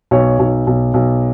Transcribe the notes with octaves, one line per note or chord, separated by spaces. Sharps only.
B1 C#5
B1
B1
B1